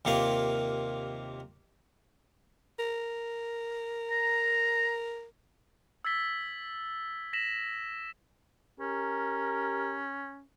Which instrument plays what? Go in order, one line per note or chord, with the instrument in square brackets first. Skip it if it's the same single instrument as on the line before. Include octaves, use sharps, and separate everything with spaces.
[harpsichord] D#2 C3 A#3 F4 F5
[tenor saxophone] A#4
[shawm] A#5
[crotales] E6 G#6 A6 B6 G7
A#6 B6 E7 F#7
[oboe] C#4 [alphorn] G4 [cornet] A#4